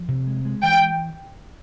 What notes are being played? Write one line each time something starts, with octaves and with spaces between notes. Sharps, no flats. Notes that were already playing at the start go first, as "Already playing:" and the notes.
Already playing: F3
C3
G#3
G#3
E3 G5